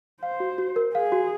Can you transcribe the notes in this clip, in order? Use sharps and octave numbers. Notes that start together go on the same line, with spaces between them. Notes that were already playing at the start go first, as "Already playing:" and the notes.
C5 F5
F#4
F#4
A#4
G#4 F5
F#4